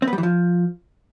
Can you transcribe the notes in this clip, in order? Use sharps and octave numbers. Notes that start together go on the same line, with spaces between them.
C4
B3
G3
E3
F3